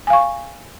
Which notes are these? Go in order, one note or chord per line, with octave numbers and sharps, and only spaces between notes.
F5 G#5 C#6